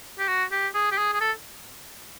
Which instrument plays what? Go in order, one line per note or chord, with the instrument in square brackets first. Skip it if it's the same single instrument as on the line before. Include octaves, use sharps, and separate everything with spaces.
[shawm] G4
F#4
G4
G#4
G4
G#4
G#4
A4